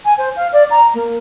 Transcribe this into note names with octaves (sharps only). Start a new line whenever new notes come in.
G#5
C5
F5
D5
A#5
A#3